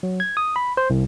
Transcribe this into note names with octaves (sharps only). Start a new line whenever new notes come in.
F#3
G#6
D#6
B5
C5
C2